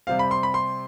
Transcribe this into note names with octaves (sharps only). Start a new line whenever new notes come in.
C3 G3 C4 F5
B5
C6
B5
C6